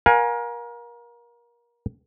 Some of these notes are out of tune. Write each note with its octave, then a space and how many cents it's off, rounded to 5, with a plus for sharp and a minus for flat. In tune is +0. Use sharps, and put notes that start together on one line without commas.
A#4 +30 F5 +35 G#5 +0